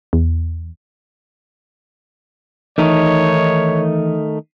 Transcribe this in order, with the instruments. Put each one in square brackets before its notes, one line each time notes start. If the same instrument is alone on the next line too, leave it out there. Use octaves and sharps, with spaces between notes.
[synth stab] E2
[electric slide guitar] D#3 A3 D#4 [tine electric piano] E3 [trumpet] C#5